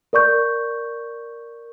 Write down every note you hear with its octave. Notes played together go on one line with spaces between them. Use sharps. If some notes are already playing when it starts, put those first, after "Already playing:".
A#4 D5 C#6 G6